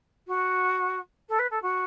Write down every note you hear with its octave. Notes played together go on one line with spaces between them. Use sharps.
F#4
A4
B4
A4
F#4